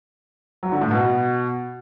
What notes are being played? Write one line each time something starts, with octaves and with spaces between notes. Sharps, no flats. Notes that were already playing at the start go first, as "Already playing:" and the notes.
F#3
D3
A2
B2